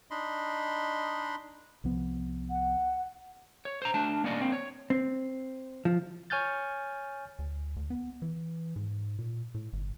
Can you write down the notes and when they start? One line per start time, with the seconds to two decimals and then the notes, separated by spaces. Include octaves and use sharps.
0.11 D4 D#4 D#5 B5 C6
1.84 C2 F3 B3
2.50 F#5
3.65 C#5
3.82 C5 A#5
3.94 A3 D4 A5
4.24 A#3 C#4 D5 D#5
4.41 A#3 C4
4.52 C#5
4.90 C4
5.85 F3
6.30 C#5 G#5 F6 G6 A6
7.39 D2
7.76 D2
7.90 B3
8.22 E3
8.76 G#2
9.19 A#2
9.54 A2
9.73 G1